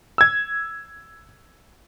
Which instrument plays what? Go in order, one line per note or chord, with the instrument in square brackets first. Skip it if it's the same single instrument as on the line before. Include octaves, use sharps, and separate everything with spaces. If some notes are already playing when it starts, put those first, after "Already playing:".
[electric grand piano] E6 G#6